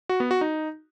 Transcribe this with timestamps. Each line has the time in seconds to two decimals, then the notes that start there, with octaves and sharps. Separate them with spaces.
0.09 F#4
0.20 B3
0.31 F#4
0.41 D#4